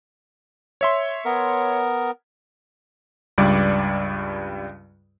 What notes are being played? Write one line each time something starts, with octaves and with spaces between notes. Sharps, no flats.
C#5 E5 C6
B3 A#4
C#2 G2 G3 D5 D6